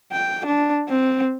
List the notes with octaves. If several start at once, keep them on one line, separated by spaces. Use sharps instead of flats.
G5
D4
C4